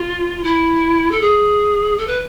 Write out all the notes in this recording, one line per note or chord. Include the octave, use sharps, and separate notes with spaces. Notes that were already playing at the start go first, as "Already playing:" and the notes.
Already playing: F4
E4
A4
G#4
A4
B4